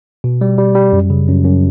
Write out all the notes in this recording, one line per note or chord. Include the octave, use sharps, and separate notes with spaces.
B2
G3
G3
G3
F#2
C#3
F#2
F#2